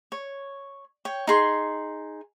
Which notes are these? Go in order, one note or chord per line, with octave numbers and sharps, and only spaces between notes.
C#5
C#5 G5
D#4 G#4 C6